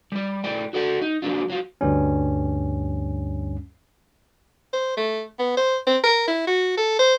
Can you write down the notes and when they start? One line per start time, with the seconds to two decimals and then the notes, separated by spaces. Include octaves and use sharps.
0.12 G3 D5
0.44 A2 D5 G5
0.73 F#4 A4 D5 F#5
1.01 D#4
1.22 F#3 A#3 B3 D4 F4
1.50 F#3 F4
1.81 D2 G2 G3 C#4
4.73 C5
4.97 A3
5.39 B3
5.57 C5
5.87 C4
6.04 A#4
6.28 E4
6.47 F#4
6.77 A4
6.99 C5